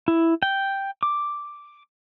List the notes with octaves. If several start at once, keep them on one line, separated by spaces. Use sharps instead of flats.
E4
G5
D6